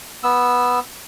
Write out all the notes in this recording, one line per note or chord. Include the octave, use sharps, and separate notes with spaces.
B3 E6